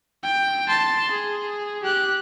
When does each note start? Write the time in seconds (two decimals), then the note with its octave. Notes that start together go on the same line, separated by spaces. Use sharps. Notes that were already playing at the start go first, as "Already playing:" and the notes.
0.23 G5
0.68 A5 C6
1.11 G#4
1.83 G4 F#6